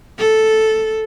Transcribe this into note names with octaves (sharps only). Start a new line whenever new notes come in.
A4